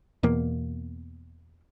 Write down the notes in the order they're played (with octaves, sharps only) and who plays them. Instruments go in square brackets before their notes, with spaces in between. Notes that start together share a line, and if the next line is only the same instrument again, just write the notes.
[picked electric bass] E2 B2 A#3